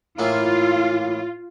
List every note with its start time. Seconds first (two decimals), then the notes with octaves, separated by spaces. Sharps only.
0.19 A2 E3 A#3 F4